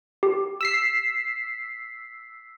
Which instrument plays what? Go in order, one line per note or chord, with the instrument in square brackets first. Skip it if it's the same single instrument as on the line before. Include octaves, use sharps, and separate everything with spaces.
[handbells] G4
[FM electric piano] E6 B6 C7